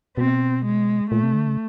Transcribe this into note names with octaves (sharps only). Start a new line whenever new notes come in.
B2 C4
G#3
A#2 A3
C3
D3
C#3